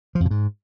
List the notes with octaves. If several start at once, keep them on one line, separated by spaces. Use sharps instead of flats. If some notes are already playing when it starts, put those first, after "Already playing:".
F3
F2
B2
G#2